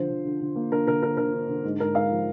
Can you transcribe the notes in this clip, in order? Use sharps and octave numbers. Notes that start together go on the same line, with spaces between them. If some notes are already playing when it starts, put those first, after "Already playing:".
Already playing: D3 F3 C5
D3
D3
D3
A#3
D3 A#4
D3 A#4
D3 A#4
D3 A#4
D3
D3
G#2
G#2 A#4
G#2 F5
F3